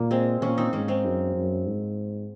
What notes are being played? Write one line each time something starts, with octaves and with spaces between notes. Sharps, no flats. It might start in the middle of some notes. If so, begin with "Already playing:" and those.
Already playing: A#2 A#3
G#3 C4
A#2 A#3 C#4
C4 D#4
G#2 A#3 C#4
G#3 C4
F#2
F#2
G#2